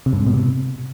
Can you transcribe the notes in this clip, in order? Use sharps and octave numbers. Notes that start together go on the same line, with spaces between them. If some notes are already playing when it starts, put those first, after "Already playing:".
C3
G2
G#2
B2
C3